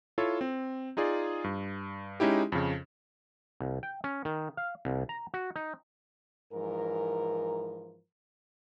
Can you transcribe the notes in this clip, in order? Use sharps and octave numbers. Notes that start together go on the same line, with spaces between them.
E4 F4 A4 C#5
C4
D#4 F4 G#4 D5
G2
G#3 C#4 D#4 E4 G4
F2 C#3
C2
G5
C#4
D#3
F5
C2
A#5
F#4
D#4
G#2 E3 F3 A#4